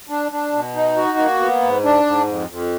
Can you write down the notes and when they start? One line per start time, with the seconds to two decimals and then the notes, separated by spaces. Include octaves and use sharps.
0.09 D4
0.32 D4
0.53 B2
0.75 D#4
0.97 F#4
1.18 A#3
1.40 B3
1.62 G#2
1.84 D4
2.06 G#2
2.28 F2
2.50 F2